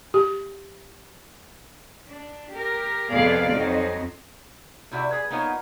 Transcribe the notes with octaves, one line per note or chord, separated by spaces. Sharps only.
G4
D4
G4 A#4
F2 C3 B3 G#4 D5 F5
F2 F#3 C4 D#4
C3 E4 F#4 D5 E5
G#4 B4
A#3 B3 D#4 F4 C#5